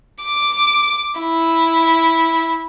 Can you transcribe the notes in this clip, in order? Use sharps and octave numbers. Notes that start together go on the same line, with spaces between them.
D6
E4